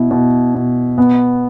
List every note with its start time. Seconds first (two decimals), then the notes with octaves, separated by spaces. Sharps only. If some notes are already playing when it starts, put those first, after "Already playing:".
Already playing: B2 E4
0.11 B2
0.55 B2
0.98 B3